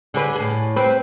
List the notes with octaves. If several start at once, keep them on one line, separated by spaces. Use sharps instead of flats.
D3 G#4 B4
A2 G#4
C4 B4